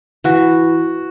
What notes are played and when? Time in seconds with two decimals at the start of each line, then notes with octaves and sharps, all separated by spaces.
0.24 E3 F#4